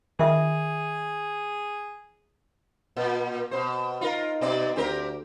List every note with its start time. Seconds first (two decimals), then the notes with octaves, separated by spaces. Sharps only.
0.19 D#3 F4 G#4 E5 D#6
2.96 A#2
3.51 B2 C5
4.01 D#4 F4 A#4
4.41 B2 C4 D5
4.76 D2 C4 G4 A#4